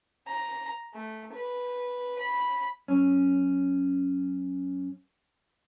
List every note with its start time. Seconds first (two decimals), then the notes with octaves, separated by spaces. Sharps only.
0.27 A#5
0.94 A3
1.33 B4
2.19 B5
2.88 F#2 C#4